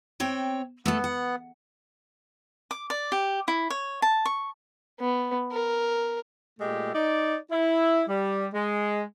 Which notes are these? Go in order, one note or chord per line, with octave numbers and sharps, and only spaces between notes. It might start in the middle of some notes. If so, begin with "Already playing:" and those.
C4 C#5 G5
A3 B3 A4
F#5
D6
D5
G4
E4
C#5
A5
C#6
B3
A#4
A#2 G#3 A3 G4
D#4 D5
E4
G3
G#3